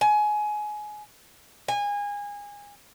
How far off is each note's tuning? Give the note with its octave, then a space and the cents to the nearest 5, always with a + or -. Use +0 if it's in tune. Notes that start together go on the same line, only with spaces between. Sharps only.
G#5 +20
G#5 -25